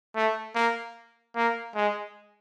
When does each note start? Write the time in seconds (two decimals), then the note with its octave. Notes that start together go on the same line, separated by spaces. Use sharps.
0.15 A3
0.55 A#3
1.35 A#3
1.75 G#3